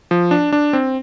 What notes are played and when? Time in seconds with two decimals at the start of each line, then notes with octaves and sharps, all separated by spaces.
0.11 F3
0.31 D4
0.52 D4
0.73 C4